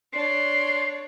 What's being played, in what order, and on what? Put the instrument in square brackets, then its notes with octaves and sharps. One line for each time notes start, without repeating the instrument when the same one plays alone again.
[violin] D4 C#5 [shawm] C6